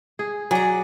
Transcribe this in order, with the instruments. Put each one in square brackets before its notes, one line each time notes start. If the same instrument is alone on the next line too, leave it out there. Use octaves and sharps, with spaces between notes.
[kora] G#4
[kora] F#3 D5 [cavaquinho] G#4 A#5